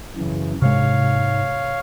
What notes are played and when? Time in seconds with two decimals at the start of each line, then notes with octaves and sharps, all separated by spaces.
0.17 F#2 C#3 E3
0.62 G#2 C3 G#3 C#5 F5